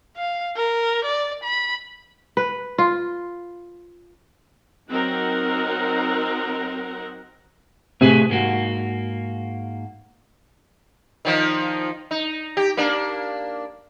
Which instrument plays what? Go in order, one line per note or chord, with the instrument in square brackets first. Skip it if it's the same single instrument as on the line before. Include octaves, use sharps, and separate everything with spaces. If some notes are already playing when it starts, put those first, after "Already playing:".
[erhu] F5
A#4
D5
B5
[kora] B4
F4
[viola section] F#3 C4 D#4 F#4 A#4 F#5
[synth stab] A2 C3 [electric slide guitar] A3 G#4 B4
[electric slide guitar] G#2 A#3 F#4
[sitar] D#3 F3 D#4
D#4
G4
A#3 D4